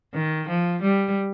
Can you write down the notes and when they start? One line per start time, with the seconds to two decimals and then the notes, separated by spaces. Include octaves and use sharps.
0.14 D#3
0.48 F3
0.82 G3